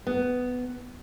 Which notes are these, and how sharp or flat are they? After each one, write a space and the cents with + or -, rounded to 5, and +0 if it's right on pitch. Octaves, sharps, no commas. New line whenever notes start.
B3 +10